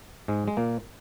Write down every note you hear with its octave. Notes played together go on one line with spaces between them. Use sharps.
G#2 G#3
G#3
A#2 A#3